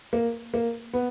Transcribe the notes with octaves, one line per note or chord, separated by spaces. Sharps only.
A#3
A#3
B3